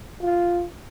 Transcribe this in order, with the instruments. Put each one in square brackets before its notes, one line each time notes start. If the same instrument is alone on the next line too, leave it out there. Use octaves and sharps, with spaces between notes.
[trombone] F4